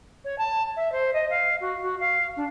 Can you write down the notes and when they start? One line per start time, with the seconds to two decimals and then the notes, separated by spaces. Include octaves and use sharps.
0.25 C#5
0.38 A5
0.76 E5
0.92 C5
1.13 D#5
1.30 F5
1.61 F#4
1.82 F#4
2.00 F5
2.36 D4